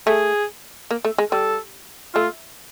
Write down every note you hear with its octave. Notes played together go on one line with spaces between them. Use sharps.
A3 G#4
A#3
A3
G#3
G3 A4
A3 F4